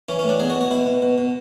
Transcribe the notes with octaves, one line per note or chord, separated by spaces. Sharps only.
E3 C#4
C#4
A2 D4
B2 G#4
F#4
B2
F#4
B2 E4
B2
B2
B2